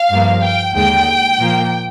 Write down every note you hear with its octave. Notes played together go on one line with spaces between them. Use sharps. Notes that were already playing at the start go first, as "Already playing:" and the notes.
Already playing: F5
G2 F3 A#3
G5
D#2 D3 G#3 G5
A#2 F3 A#3